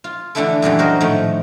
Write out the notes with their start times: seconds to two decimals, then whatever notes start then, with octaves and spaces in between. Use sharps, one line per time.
0.04 F4
0.35 D3 E3 A3 D4 E4 A4
0.62 F#2 A#2 E3 G3
0.79 F#4 A#4 C5 D#5
1.00 A2 D#3 F3 A3